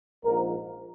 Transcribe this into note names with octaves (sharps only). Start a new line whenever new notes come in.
A#1 G#2 F3 A#4